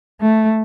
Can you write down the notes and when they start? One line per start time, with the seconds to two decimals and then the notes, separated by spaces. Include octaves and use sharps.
0.21 A3